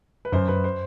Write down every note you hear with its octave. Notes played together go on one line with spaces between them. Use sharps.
B4
F#2 C5
F#2 B4
C5